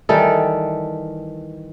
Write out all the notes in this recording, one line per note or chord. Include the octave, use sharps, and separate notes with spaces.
D#3 E3 G3 A4